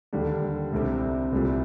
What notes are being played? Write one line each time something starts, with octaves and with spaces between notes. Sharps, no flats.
D#2 D3 G3 D4
C2 C3 G3 C4
C2 A#2 G3 C4